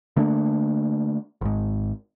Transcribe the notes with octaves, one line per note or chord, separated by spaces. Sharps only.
D3 A3 A#3 D4
G#1 G#2